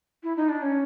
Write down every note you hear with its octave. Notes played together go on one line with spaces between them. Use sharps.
E4
D#4
D4
C#4